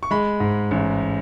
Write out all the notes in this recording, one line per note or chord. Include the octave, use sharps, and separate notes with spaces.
C#6
G#3 B5
G#2
A1